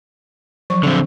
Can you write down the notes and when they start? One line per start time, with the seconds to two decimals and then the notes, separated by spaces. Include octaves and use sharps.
0.70 F3 F#3 C#6
0.83 D3 C4